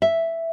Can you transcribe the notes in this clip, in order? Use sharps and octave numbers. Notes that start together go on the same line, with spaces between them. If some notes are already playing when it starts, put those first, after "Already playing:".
E5